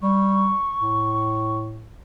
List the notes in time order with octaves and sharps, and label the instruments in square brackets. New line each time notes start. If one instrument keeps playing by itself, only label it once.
[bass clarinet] G3 [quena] C#6
[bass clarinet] A2